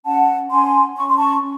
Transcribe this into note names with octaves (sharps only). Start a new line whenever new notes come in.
C#4 F#5 A5
C#4 G#5 C6
C#4 C#6
C6
A5 C#6
C#4